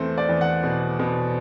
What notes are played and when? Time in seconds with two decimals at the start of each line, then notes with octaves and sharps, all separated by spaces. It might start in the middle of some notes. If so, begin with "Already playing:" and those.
Already playing: E2 A3 C4 C5
0.18 D5
0.29 E2
0.41 F#5
0.63 B2
0.99 B2